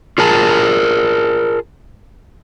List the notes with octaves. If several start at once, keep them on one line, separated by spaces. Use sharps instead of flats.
F4 G#4 A#4 A5